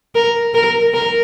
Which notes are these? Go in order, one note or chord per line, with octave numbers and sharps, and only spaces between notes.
A#4
A#4
A#4